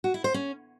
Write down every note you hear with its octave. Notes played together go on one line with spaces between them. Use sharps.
F#4
E4
C5
C#4